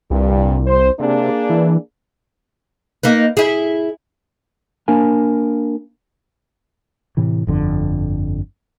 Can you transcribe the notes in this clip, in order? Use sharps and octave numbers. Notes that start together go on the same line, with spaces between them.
C2 G2 A#2 G3
C5
C3 A#3 D4 G#4
E3
A#3 D#4 B4
E4 G#4
A#3 D4 A#4 F5 G#5
A2 C3 E3
G1 F2 D3